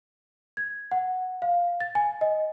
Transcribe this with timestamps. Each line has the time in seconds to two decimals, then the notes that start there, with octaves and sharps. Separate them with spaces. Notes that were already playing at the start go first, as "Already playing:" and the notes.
0.57 G#6
0.91 F#5
1.42 F5
1.80 A6
1.95 G#5
2.21 D#5